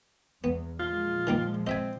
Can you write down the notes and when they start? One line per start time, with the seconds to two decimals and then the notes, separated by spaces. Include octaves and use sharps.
0.44 E2 B3
0.79 A#2 F3 G#3 F4
1.27 D#3 G3 A#3
1.67 C4 D#5 E5 G#5